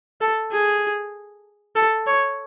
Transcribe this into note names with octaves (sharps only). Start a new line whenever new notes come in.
A4
G#4
A4
C#5